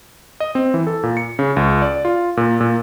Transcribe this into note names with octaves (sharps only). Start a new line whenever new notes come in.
D#5
C4
E3
A4
A#2
C#7
C#3
C#2
D5
F4
A#2
A#2